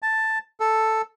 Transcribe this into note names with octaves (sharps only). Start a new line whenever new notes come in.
A5
A4